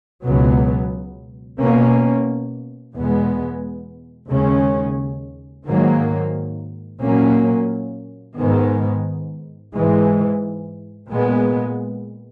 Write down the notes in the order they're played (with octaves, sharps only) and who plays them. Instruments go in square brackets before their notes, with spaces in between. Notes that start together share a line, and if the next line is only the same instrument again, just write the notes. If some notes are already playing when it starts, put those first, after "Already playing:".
[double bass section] C#2 B2 F#3 B3
B2 A#3 C#4
E2 B2 G#3 B3
D#2 C#3 G#3 C#4
G#2 D#3 F#3 A#3
A#2 F#3 A#3 C#4
G#2 D#3 G#3 B3
G#2 E3 G#3
A#2 G#3 B3